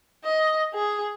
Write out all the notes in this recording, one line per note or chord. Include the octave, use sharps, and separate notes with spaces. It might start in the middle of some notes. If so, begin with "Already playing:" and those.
D#5
G#4